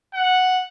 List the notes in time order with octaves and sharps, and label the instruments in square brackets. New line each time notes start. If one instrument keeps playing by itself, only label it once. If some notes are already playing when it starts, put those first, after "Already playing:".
[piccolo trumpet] F#5